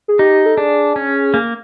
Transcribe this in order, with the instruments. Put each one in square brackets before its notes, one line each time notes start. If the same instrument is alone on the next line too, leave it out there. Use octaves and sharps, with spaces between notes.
[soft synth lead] G#4
[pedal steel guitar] D#4 [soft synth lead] G4
[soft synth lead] A4
[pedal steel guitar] D4 [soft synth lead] G#4
[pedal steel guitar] C#4
A#3